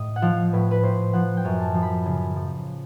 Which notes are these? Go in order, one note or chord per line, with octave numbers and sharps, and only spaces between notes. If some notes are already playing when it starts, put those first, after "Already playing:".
Already playing: A2 D#5
F#5
F3 F5
A2 B4
B4
A2 C5
F3 F#5
G5
F#2
A5
F3
B5
C#3
F3